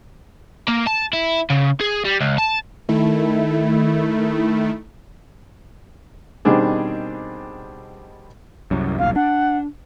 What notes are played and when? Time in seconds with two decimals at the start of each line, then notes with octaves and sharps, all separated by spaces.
0.68 A#3
0.87 A5
1.13 E4
1.50 C#3
1.81 G#4
2.05 G3
2.20 C#2
2.38 A5
2.89 D#3 A3 E4
6.45 B2 D#3 G3 C4 D4 G#4
8.71 C2 F#2
8.99 D#1 B1 F5
9.16 D4 F#5